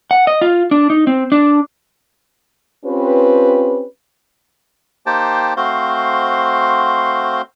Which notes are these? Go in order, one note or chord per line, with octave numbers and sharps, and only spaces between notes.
F#5
D#5
F4
D4
D#4
C4
D4
C4 C#4 F4 G4 B4
A#3 D#4 G4 C5 G5 A5
A3 C4 F#4 C5 F5 C6